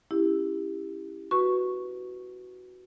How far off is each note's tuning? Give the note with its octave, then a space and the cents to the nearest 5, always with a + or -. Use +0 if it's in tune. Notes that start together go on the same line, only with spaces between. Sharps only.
C#4 +0 E4 +0 G4 +15
F#4 +0 B4 +0 C#6 +0